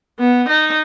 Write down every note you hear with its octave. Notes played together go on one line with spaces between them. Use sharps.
B3
D#4